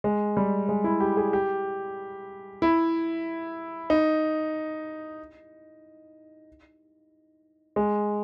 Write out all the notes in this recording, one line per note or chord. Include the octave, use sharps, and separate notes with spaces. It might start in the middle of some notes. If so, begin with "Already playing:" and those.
G#3
G3
G#3
E4
G4
G#4
G4
E4
D#4
G#3